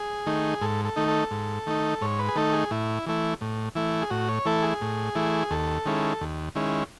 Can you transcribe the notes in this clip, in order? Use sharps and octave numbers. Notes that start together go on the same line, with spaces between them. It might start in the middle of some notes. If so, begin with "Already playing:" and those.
Already playing: G#4
D#3 A3 D#4
G#2 A4
A4
D#3 A3 D#4
A4
G#2
D#3 A3 D#4
G#2 C#5
B4
G#4
D#3 A3 D#4 A4
G#4
A2 E4
E3 A3 E4
A2
E3 A3 E4
G#4
A2 F#4
C#5
E3 A3 E4 A4
G#4
A2
E3 A3 E4
D#2 A4
D#3 G#3 C#4 E4
D#2
D#3 G#3 C#4 E4